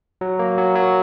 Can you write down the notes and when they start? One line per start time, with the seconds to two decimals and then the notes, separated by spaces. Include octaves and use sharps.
0.21 F#3
0.39 A#3
0.58 F#3
0.76 F#3